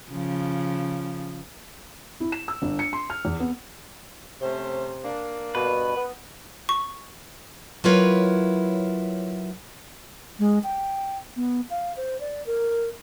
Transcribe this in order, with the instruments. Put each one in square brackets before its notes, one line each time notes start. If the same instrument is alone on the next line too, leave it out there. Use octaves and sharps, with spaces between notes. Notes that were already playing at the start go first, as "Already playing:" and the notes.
[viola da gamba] C#3 F3
[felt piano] E4
E7
E6
G1
C#7
C6
F6
E2
B3
[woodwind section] C3 [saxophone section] A3 C#4 C5
[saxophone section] A#3 D4
[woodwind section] G2 B2 [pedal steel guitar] B4
[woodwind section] B3
[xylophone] C#6
[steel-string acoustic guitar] F#3 E4 F4 A#4 B4 C#5
[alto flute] G#3
G5
B3
F5
C5
D5
A#4